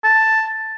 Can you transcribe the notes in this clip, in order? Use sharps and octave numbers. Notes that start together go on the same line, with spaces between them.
A5